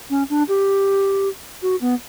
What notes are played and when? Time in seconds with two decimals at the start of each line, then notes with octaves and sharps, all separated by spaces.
0.10 C#4
0.30 D4
0.49 G4
1.62 F#4
1.81 B3